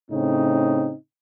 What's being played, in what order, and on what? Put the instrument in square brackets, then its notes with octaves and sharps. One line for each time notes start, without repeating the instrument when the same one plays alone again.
[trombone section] A2 C#3 C4 D#4